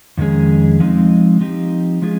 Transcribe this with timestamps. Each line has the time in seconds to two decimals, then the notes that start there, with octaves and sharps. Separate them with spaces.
0.18 F2 D#3 G#3 C#4 G#4
0.80 F3 G#3 C4 D#4
1.41 F3 C4 D#4 G4
2.02 F3 G#3 C#4 F4 G#4